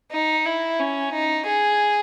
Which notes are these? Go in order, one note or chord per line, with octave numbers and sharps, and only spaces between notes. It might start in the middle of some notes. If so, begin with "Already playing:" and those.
D#4
E4
C#4
D#4
G#4